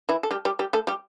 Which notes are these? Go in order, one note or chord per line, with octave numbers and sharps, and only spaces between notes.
E3 E4
A4
G3 G4
G3 G4
G3 G4
A3 A4
G3 G4